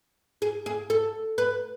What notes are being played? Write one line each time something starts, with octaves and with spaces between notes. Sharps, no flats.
G#4
G#4
A4
B4